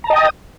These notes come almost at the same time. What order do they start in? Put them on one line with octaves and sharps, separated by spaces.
A#5 A5 D#5 G5 D#6